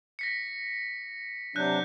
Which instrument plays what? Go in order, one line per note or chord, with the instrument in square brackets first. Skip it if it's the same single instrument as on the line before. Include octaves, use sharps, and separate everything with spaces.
[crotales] A#6 B6 C#7
[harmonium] C3 F#3 D4 [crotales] F#6 G6